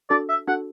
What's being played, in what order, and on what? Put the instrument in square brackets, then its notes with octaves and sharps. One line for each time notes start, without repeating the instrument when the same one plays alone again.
[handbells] D4 F#4 A4 [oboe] D5
[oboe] E5
[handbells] D4 F#4 A4 [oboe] F#5